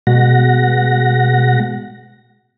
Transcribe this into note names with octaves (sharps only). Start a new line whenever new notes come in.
B2 G#3 F#5 A#6